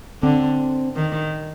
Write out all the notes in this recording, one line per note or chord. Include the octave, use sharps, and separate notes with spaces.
D3 C4
D#3